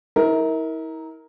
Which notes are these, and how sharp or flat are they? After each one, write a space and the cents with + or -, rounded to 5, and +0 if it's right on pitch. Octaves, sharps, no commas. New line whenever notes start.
E4 -40 A#4 +0